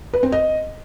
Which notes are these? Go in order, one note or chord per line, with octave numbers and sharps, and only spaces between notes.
B4
C4
D#5